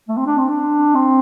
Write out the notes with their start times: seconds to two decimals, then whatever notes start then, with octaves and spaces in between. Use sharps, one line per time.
0.08 A3
0.17 C4
0.26 D4
0.38 C4
0.49 D4
0.95 C4